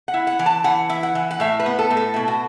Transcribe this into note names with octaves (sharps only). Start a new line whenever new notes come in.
F#5
E4
F#5
E3
A5
E3 F#5
E4
F#5
E3
F#5
A2 E5
B4
B3
A4
A2
A4
B2 E4
F#4